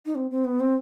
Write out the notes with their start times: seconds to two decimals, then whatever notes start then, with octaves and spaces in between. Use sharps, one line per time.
0.06 D#4
0.15 C4
0.31 C4
0.45 B3
0.60 C4